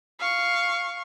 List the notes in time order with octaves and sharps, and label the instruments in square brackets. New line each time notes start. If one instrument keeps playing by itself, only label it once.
[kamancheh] F5 C#6